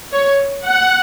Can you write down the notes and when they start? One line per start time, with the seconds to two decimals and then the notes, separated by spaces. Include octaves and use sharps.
0.13 C#5
0.64 F#5